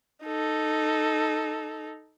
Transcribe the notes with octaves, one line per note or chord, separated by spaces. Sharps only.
D#4 A4